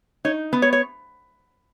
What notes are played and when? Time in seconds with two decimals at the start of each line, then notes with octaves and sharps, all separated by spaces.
0.25 D#4 C#5
0.53 B3
0.62 C#5
0.73 C#5